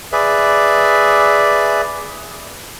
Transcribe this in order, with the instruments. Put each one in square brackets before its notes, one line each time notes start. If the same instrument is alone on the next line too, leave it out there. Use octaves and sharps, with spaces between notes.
[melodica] G#4 B4 D5 E5